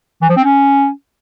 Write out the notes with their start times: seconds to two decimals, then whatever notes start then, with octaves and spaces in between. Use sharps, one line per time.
0.22 E3
0.29 F3
0.37 C4
0.44 C#4